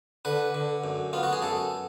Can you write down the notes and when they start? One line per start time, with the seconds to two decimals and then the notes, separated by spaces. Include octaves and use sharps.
0.25 D3 B4
0.54 D3
0.84 F#2
1.13 B3 F4
1.23 F#4
1.33 G#4
1.42 F#2 A4